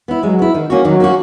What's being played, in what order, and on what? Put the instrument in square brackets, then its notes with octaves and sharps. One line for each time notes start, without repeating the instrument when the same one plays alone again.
[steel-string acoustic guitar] B3 E4
[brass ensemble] F#3 [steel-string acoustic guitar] G#3
[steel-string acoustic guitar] B3 E4
D#3
A#3 C#4 F#4
[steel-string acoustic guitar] D#3 [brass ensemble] F#3
[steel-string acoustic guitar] A#3 C#4 F#4